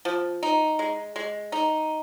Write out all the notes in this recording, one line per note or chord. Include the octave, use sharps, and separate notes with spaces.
F3
D#4
G#3
G#3
D#4